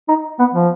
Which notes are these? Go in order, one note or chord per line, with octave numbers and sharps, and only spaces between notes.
D#4
B3
F3